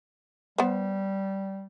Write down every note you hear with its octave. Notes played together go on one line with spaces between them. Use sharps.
G3 B3 C5